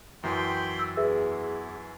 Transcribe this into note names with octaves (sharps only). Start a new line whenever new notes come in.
F#2 E3 F#3 G5 B5 C6
E6
E2 G#4 B4 E5